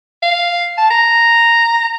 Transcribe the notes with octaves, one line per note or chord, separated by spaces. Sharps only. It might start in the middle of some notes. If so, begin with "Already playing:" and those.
F5
A5
A#5